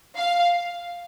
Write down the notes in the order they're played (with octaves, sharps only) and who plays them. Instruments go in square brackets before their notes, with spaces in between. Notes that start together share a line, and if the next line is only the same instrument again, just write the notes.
[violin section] F5